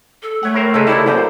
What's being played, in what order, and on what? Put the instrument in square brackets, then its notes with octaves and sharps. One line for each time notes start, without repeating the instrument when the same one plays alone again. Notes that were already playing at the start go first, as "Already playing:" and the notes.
[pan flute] A4
[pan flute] A3 [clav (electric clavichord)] C#5 F#5
[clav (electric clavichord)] A2 A#4 C5
[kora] C#3 C#4 A4 [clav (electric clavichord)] G#3 D#4 E5
[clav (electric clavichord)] D#3 A3 E5 [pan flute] E4 [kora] G4 D5
[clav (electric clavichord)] C2 F#2 [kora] A#3 D4 [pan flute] C5